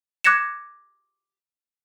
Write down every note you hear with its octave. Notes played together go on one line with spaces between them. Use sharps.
D6 F#6 G#6 A#6 C#7 E7